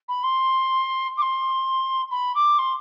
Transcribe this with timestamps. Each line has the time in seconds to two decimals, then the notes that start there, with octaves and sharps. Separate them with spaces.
0.08 B5
0.23 C6
1.17 D6
1.22 C6
2.11 B5
2.35 D6
2.58 C6